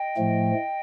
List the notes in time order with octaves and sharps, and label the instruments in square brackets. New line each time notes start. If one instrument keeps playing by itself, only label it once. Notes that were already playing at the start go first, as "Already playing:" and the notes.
Already playing: [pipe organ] D#5 G5
A2 F3 A3